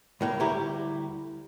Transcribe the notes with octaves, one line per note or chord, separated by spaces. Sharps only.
C#2 A2 A#3
D2 G3 E4 G4 A#5